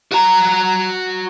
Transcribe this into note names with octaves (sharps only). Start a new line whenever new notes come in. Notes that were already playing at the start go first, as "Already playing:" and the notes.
F#4 A#5